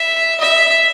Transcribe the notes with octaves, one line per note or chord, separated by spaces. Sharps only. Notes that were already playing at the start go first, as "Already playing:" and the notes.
Already playing: E5
E5